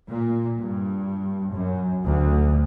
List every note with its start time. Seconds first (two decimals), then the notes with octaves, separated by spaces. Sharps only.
0.10 A#2
0.59 G2
1.51 F#2
2.04 D2